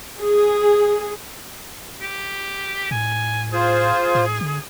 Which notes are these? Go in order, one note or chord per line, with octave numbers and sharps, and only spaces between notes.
G#4
G4
A2 G#5
F4 G#4 C5
A2
D3